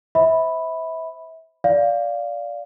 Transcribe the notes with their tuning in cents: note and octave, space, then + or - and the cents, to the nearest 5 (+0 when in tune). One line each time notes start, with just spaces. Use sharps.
C5 +0 E5 -25 B5 +0
D5 -15 F5 +0